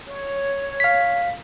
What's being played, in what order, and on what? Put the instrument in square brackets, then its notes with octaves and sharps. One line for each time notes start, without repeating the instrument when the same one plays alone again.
[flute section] C#5
[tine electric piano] F5 B6